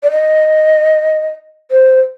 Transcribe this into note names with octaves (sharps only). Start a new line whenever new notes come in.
D5
D#5
C5